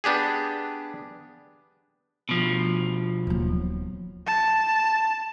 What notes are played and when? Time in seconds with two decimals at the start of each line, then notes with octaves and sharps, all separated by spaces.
0.04 B3 D4 G4 G#4
2.29 B2 F3
3.27 D#1 F#3
4.27 A5